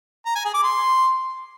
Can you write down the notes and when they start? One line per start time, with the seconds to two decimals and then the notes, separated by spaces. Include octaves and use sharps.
0.26 A#5
0.35 G#5
0.45 G#4
0.54 D6
0.63 C6